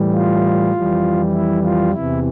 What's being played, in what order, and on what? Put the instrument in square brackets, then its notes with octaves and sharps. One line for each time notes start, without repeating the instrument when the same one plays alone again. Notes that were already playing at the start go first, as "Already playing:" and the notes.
Already playing: [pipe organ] A2 E3 G3
F4
F2 E3 G3
E4
F4
E2 C3 E3 E4